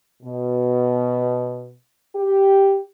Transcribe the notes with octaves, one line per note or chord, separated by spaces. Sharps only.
B2
G4